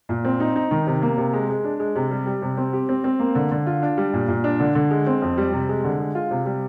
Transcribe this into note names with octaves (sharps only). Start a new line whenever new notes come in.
A#2
C4
D#4
D#4
D#3
C3
A#3
C3
G#3
G#3
D4
G#3
C3
G3
G3
C3
C4
G4
C4
C4
A#3
D3
D3
F4
D4
G3
A#2
A#2
D4
D3
D3
G#3
C4
F2
G3
C3
G#3
D3
G#3
F4
C3
G3